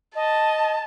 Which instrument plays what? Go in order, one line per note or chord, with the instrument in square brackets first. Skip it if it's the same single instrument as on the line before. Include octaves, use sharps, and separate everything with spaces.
[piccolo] D#5 [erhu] A5